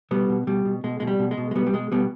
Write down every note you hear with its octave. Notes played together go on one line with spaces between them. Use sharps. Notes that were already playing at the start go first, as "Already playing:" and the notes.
B2 G3 B3
B2
B2 G3
B2
B2 G#3
B2 G#3
G3
B2
G#3
B2
G#3
B2 G3 B3
G3
B2 G#3
B2 G3 B3